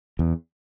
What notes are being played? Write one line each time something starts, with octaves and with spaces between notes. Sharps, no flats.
E2